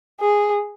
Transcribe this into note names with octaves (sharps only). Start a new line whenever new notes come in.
G#4